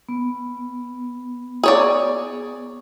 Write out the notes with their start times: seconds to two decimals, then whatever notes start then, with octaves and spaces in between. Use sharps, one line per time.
0.09 B3
1.63 G#4 C#5 D5